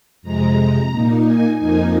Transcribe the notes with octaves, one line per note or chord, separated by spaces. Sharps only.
F2 C3 G#3 A#5
A#2 A#3 D#4
G#5
F2 F3 A#3 D#4 G#5